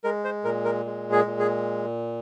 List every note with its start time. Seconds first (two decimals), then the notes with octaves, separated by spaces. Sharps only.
0.04 G#3 A#4
0.24 C5
0.44 A#2 A#4
0.65 A#4
0.85 G#3
1.12 G#4
1.26 A#2
1.39 G#4